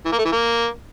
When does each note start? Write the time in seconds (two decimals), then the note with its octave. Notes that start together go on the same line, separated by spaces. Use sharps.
0.05 E3
0.12 A#3
0.19 A3
0.25 E3
0.32 A#3